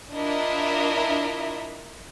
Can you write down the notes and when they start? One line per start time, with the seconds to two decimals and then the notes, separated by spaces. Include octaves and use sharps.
0.14 D4 E4 F4 A#4 D#5 E5